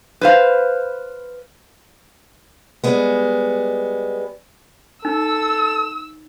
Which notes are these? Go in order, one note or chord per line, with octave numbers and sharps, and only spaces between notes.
B4 C5 F5
G3 G#3 B3
D#4 A4 E6